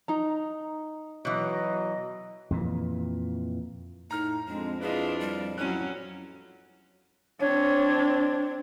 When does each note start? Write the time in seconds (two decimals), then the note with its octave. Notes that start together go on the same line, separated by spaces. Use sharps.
0.08 D#4 A#5
1.25 B2 E3 F#3 D#5
2.50 F2 A#2 E3
4.11 A2 D#4 A#5 F6
4.48 F2 G#3 C4 D4
4.81 D4 E4 F4 G#4 B4 D#5
5.20 G3
5.58 F#3 C#4 E4 F#6 D#7
7.40 C4 D4 C#5